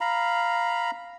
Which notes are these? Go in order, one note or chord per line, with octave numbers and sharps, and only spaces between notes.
F5 A#5 B5